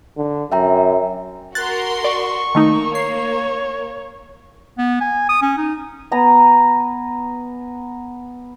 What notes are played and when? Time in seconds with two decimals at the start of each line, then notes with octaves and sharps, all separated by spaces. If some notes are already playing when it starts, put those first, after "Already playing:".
0.17 D3
0.52 F#2 E5 G5 A#5
1.55 F#4 A#4 C6 F#6 A6
2.05 D5 C#6
2.55 D#3 A3 A#3 D#4
2.95 C#5 C7
4.78 B3
5.01 G#5
5.29 D#6
5.42 C#4
5.57 D#4
6.12 B3 G#5 A#5